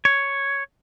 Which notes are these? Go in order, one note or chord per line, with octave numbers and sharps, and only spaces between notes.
C#5